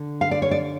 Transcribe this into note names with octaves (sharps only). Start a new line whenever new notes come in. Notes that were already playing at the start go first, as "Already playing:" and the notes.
Already playing: D3
F5
D5
C#5
D5